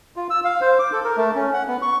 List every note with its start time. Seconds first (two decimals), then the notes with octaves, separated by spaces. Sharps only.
0.16 F4
0.30 E6
0.45 F5
0.61 C5
0.79 D6
0.92 A4
1.05 A#4
1.17 A3
1.35 C#4
1.53 F#5
1.68 B3
1.82 C#6